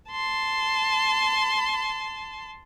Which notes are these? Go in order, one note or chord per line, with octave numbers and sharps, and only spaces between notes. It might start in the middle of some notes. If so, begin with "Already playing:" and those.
A5 C6